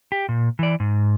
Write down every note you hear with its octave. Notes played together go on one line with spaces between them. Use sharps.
G4
A#2
E3 D5
G#2